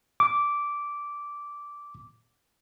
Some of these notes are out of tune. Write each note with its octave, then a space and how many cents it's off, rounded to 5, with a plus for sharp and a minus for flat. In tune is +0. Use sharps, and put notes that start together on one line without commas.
D6 -10